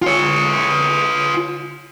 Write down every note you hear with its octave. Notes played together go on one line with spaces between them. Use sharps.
F4 C#5